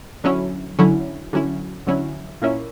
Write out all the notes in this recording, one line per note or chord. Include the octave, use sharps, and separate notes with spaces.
D3 F#3 C#4 E4
D3 F#3 C#4 E4
D3 F#3 C#4 E4
D3 F#3 C#4 E4
A#2 A#3 C#4 E4